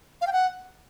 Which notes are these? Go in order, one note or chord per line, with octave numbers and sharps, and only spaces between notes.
F5
G5
F#5